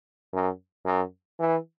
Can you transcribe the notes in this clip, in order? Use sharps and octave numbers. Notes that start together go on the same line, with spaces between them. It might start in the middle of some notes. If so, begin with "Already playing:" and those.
F#2
F#2
E3